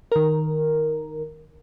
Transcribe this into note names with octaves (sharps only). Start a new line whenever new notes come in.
D#3 A#4